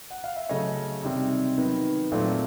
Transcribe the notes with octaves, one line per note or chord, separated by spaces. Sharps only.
F#5
F5
E5
C#3 F#3 A3 C#5 D#5
C3 D#3 G3 C4
D#3 F#3 B3
A#2 F#3 A3 C4